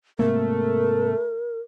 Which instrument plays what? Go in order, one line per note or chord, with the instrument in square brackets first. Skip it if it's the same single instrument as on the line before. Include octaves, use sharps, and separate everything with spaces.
[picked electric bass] G#2 C3 A#3 [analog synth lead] A3 [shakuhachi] A#4